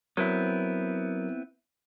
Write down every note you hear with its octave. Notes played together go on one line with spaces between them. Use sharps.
F#3 B3 C4 E4 A#4